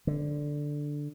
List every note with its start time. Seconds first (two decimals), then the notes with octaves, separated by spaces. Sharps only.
0.07 D3